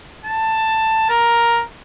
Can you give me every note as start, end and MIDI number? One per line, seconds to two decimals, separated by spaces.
0.25 1.07 81
1.09 1.62 70